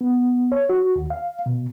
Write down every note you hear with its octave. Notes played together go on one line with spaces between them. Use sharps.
B3
C#5
F#4
D#2
F5
B2